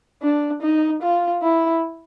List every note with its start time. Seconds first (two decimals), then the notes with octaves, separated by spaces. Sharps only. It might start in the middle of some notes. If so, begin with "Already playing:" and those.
0.22 D4
0.62 D#4
1.02 F4
1.43 E4